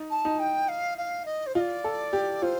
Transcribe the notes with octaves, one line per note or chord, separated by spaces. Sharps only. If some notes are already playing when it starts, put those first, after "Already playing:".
Already playing: D#4
A5
D#4
G5
F5
F5
D#5
C5
F4 D5 D#5
A4
G4
F4 C5